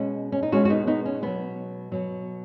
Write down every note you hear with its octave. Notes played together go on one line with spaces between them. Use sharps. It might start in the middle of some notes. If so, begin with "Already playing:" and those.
Already playing: B2 G#3 C#4 F#4
C#4
D#4
B2 G#3 C#4 F#4
F#4
B3 D#4
B3 D#4
C#4
B2 F#3 B3
B2 F#3